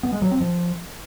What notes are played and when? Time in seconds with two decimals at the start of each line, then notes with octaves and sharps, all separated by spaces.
0.03 B3
0.13 G#3
0.22 F#3
0.31 C4
0.40 F3